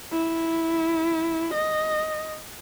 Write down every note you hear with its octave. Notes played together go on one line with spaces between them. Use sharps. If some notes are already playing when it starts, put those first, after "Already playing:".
E4
D#5